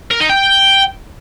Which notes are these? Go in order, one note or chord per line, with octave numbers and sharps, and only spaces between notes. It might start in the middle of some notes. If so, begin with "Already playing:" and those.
A#4
D#4
G5